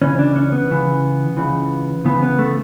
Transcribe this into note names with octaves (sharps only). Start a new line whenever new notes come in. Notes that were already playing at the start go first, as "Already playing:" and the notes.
C#2 C#3 E3 C#4
D4
C#4
B3
C#2 C#3 E3
C#2 C#3 E3
C#2 C#3 E3 B3
B3
A3